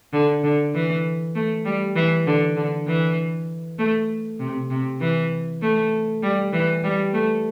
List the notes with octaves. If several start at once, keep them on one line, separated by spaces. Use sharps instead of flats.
D3
D3
E3
A3
G3
E3
D3
D3
E3
A3
C3
C3
E3
A3
G3
E3
G3
A3